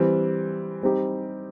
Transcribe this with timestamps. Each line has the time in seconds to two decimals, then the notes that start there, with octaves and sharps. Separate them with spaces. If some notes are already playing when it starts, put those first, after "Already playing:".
Already playing: E3 G3 C4
0.83 G3 C4 D#4 G4